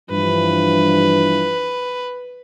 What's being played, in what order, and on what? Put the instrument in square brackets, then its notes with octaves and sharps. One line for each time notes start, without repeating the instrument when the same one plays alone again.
[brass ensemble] G2 E3 F3 [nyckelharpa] B4